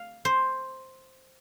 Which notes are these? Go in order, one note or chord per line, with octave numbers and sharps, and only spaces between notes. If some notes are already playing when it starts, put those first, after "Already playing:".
Already playing: F5
C5